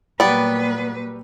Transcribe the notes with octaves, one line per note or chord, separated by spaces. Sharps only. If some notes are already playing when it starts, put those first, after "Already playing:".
A#2 F#3 G3 B3 G4 B4 D5